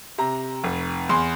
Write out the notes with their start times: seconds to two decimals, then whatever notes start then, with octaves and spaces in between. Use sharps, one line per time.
0.18 C3 A#5
0.64 F1
1.09 E2 C6